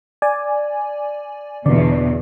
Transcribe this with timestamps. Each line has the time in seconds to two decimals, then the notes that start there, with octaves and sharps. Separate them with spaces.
0.22 D5 G#5
1.66 E2 B2 D3 B3 D5